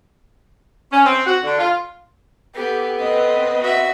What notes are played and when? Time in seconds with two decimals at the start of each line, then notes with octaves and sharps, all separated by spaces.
0.91 C#4
1.06 C4
1.26 F#4
1.44 D3
1.59 F4
2.55 B3 G4 A4
3.00 C4 B4 D#5
3.60 F#4 E5